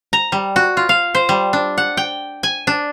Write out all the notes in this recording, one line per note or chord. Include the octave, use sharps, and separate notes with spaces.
A#5
G3
F#4
F4
F5
C5
G3
D4
F#5
G5
G#5
D4